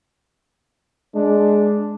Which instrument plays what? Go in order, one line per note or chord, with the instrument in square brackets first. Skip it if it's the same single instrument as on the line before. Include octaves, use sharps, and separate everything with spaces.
[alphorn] G#3 [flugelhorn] D4